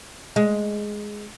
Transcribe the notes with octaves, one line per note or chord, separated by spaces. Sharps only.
G#3